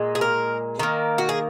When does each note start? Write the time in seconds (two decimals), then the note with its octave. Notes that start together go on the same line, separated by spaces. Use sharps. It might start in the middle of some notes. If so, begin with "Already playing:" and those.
Already playing: A#2 G#3
0.15 G#4
0.21 A#4
0.79 D#3 A#3
1.18 F#4
1.29 G#4